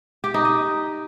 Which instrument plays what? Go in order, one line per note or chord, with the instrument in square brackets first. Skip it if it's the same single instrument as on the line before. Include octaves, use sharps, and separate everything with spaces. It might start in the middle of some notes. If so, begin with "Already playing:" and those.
[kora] G4
D#4
D#5